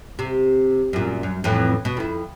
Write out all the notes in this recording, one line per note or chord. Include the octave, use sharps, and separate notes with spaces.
C3
F#2 A#2
F#2
F2 A2 E3
B2
F2 E4